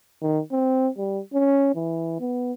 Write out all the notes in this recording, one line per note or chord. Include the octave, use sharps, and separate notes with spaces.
D#3
C4
G3
C#4
E3
B3